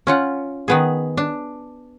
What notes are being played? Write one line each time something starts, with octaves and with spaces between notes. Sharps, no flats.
C#4 F4 F#5
D#3 B3 G#4
D4